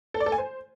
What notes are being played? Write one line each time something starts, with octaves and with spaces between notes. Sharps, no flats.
A4
D5
A4
G#5
C5